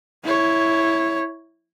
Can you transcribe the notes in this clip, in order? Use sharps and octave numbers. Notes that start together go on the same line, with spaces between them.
E4 C#5